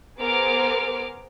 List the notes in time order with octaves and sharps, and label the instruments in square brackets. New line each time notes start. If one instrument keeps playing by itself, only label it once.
[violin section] B3 G#4 A#4 C5 D6 F6